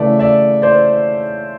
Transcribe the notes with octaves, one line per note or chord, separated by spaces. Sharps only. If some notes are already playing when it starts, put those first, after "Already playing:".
Already playing: C#3 E3 A3 D5 E5
D5 E5
C5 D5